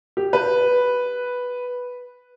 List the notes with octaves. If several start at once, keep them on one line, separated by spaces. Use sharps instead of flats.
G4
B4